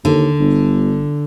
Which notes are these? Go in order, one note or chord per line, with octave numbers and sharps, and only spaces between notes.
D#2 D3
G1